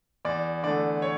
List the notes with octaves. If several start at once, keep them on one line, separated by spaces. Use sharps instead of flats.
E2 D5
D3 A3 D5
C#5